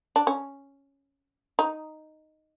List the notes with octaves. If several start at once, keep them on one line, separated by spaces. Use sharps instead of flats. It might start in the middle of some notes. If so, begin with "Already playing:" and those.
D4
C#4
D#4